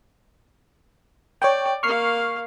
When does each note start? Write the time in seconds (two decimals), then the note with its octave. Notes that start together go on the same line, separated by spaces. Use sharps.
1.42 C#5 D5 G5
1.83 A#3 F5 C#6 F6 C7